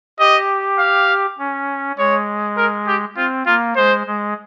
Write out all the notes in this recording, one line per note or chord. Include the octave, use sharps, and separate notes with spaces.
G4 D#5
F5
C#4
G#3 C#5
A#4
G4
C4 F4
A#3 F4
G#3 C5
G#3